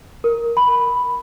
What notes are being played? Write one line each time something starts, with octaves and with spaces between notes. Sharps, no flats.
A#4
B5